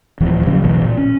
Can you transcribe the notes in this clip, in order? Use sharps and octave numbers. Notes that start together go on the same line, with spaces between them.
D1 D#2 E3 F3
D#1 C#3 F#3 C#4
F1 B1 B2 E3
A#2
C#4